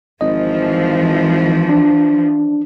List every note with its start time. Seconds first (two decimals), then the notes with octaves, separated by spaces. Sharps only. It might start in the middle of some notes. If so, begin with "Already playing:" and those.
0.21 G#1 E3 F3 D#5
1.69 D4